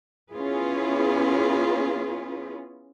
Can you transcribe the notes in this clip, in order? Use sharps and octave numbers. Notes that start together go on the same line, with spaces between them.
B3 C#4 E4 F4 G#4 B4